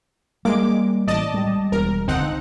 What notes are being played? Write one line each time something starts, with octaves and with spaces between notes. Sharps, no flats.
G3 G#3 A#3 D6
A1 D5 D#5 A5
G3 G#3
E1 A#4
C#2 D3 C4 D#4 F#5